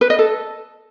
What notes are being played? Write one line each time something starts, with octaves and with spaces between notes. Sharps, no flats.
B4
D#5
A4